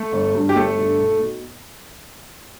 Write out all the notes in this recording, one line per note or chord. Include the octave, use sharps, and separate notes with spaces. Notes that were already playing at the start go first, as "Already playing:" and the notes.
Already playing: A3 A4
G1
G2 D3
G4
G1 A3 A4
G2 D3
B1
B2